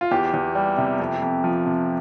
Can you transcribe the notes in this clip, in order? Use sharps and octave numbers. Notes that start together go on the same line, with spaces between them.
F4
E2 G4
E2
G3
C3
F2
F2
F3
C3